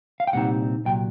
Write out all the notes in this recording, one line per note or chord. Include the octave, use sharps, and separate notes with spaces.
F5
G5
C2 A#2 G3 C4 D#4 F#5
C2 A#2 F#3 G5